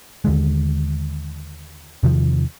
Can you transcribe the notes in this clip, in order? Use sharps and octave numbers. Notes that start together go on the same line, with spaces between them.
D#2 D3 G#3
E2 C3 D#3 F3